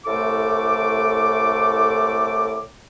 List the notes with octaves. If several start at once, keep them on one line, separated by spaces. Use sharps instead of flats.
C2 A2 A3 A4 D6